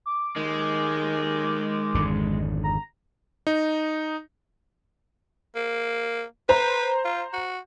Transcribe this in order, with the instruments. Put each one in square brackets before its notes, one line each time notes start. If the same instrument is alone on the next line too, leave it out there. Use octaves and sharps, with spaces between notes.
[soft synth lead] D6
[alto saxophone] D#3 [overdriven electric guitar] G#3
[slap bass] G#1 F2 D3
[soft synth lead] A#5
[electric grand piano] D#4
[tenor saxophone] A#3
[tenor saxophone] B4 [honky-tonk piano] C5 A#5
[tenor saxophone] F4
F#4